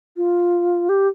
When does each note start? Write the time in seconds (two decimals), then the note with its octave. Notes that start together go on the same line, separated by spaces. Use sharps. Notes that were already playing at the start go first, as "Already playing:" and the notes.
0.17 F4
0.89 G4